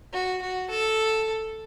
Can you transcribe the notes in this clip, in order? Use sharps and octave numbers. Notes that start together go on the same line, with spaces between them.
F#4
F#4
A4